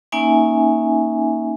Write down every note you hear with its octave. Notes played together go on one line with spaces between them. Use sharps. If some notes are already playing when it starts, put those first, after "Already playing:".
A#3 C#4 D#4 E5 G#5